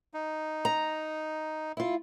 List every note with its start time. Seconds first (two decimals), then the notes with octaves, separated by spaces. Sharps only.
0.14 D#4
0.65 A#5
1.77 E4 F4